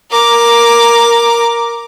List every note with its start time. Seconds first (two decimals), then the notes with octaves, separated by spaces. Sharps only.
0.11 A#4 D6